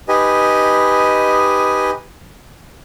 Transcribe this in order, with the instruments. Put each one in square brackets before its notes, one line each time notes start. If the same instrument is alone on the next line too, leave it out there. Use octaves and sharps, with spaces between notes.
[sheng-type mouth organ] D#4 G4 B4 D#5 G#5